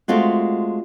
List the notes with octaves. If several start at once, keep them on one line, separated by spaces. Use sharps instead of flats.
G#3 A3 C4 F4 F#4